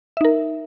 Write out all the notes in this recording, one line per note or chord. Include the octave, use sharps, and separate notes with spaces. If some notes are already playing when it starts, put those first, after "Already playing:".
D#4 A#4 E5